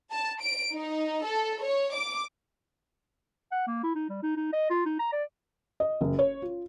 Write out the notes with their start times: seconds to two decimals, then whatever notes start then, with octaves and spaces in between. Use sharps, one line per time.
0.12 A5
0.41 D7
0.74 D#4
1.25 A4
1.63 C#5
1.96 D6
3.52 F#5
3.67 A#3
3.84 E4
3.95 D#4
4.09 G3
4.23 D#4
4.37 D#4
4.53 D#5
4.70 F4
4.86 D#4
5.00 A#5
5.12 D5
5.80 D#5
6.01 F#1
6.19 C#5
6.42 F4